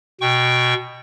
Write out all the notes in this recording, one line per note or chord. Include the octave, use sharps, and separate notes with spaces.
B2 G5 C#6